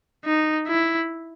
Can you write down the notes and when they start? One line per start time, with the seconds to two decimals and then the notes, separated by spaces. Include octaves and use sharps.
0.25 D#4
0.67 E4